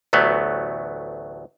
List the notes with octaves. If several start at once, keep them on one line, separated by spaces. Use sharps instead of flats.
A1 D2 F#3 A3 B3